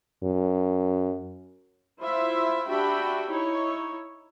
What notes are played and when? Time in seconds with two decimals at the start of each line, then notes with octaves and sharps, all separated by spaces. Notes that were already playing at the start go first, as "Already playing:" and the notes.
0.23 F#2
2.00 E4 F4 C5 E5
2.68 D4 F#4 G4 E5 G5 B5
3.31 D#4 E4 C#5